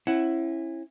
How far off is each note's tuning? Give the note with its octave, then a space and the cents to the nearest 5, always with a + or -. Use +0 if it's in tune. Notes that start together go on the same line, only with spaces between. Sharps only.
C#4 -40 E4 +5 F#5 +10